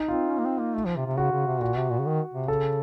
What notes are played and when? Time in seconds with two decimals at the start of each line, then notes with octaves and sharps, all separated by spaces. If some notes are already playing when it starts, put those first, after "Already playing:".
Already playing: D#4
0.08 C4 F4
0.30 C#4
0.39 A#3
0.46 C4
0.60 A#3
0.75 A3
0.85 F3
0.96 C3
1.07 C3
1.18 C#3 F#4
1.32 C#3
1.47 C3
1.61 A#2 F#4
1.77 C3
1.90 A#2
1.99 C#3
2.06 D#3
2.34 C3
2.48 C#3 A4